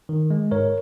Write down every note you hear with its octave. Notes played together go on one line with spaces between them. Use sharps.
D#3
G#3
G#2 A#4 C#5